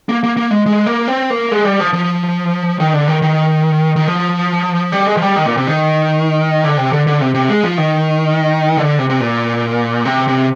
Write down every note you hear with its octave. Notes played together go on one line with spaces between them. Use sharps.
A#3
A#3
A#3
G#3
G#3
A#3
C4
A#3
G#3
G3
F3
F3
D#3
D3
D#3
D#3
D#3
F3
G3
G#3
F3
G3
D#3
A#2
C3
D#3
D3
C3
D3
D3
C3
C3
G#3
F3
D#3
D3
C3
C3
A#2
C3
C3